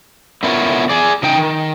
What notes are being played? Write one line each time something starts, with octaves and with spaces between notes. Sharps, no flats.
D3 B3 E4 F4 A#4 C#5
G#4 D5
C#3 D#4 G5
D#3